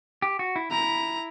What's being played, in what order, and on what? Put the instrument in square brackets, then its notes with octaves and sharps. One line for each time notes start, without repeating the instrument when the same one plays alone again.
[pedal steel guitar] G4
F#4
E4
[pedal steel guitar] E4 [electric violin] A#5